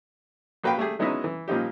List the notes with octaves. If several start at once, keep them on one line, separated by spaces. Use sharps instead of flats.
A#1 F#4 B4 F5 G5
G3 A3 G4 G#4
F#3 G#3 B3 C#4 D#4 E4
E3
A#2 F3 G3 D#4 G4